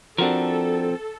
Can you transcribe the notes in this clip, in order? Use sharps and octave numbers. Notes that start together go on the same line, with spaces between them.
F3 C4 D4 F#4 A4 A#4